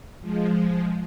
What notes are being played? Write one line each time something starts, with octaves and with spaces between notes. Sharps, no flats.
F3 G#3